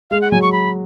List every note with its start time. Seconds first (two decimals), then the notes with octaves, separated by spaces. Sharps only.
0.10 G#3 F5
0.21 F#5
0.31 F#3 G#5
0.42 C#6
0.52 B5